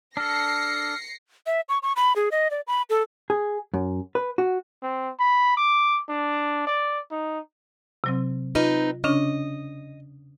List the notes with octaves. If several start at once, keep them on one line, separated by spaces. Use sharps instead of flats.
D4 A4 F6 A#6 C7 C#7
E5
C#6
C#6
B5
G#4
D#5
D5
B5
A4
G#4
F#2
B4
F#4
C4
B5
D6
D4
D5
D#4
C3 F#3 C4
C4 D#4 F4 B4 D#5
C#3 C#4 D4 D#5